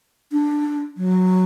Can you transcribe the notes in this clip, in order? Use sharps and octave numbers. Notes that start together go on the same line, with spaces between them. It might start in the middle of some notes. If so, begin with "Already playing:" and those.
D4
F#3